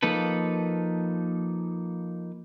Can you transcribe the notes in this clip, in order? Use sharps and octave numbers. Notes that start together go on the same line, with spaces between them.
F3 A#3 D#4 A4 B4